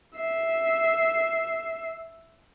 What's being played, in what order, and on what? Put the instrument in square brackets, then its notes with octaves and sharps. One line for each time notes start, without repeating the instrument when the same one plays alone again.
[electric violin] E5 C7